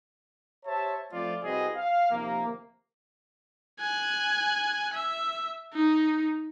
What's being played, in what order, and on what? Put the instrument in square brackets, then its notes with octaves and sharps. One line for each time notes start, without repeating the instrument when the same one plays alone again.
[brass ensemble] G4 C5 C#5 E5 A5
F3 A3 C4 F4 C5 D5
C2 C4 F#4 G#4 B4 D#5
F5
D#2 C3 F3 A#3
[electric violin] G#5 F#6
E5
D#4